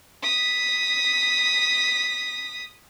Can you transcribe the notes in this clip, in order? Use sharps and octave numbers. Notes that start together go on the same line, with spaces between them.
D#6 B6